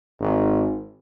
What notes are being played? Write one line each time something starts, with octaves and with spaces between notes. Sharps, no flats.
G#1